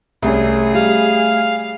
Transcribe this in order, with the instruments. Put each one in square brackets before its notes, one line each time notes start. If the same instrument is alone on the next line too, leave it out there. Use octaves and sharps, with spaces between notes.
[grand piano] C2 C#4 [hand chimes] A3 E5 [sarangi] G#4
[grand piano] G3 [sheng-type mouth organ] F5